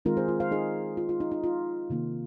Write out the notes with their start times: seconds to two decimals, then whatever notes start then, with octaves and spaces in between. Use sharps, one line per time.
0.05 D#3 G#3 C4 D#4 F4 A#4
0.17 G#4 C5
0.28 F4
0.40 C5 F5
0.51 D#4 G#4
0.97 F4
1.09 F4
1.20 D#4
1.31 D#4
1.44 F4
1.90 C3 D#3 A#3 D#4